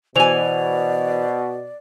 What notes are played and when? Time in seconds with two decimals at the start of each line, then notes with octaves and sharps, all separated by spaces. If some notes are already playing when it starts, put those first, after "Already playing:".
0.16 B2 E3 C5 D5 G#5 F7